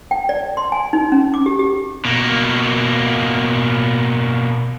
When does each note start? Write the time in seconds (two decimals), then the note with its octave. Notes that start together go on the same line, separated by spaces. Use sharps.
0.11 G5
0.29 D5
0.57 C6
0.72 G#5
0.93 D#4
1.12 C#4
1.34 D6
1.46 G4
1.59 G4
2.05 B2 A#3